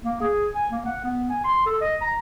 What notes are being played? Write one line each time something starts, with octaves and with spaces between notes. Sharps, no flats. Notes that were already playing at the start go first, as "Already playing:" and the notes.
A#3
G#4
G#5
A#3
F#5
B3
G#5
C6
A4
D#5
A#5